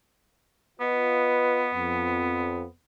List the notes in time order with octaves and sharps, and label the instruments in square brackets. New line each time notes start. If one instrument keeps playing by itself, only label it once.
[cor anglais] B3 [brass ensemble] F4 B4 D#5
[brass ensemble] F2